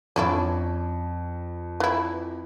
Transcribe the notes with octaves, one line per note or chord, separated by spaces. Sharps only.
F2 C#4 D4 E4
E3 E4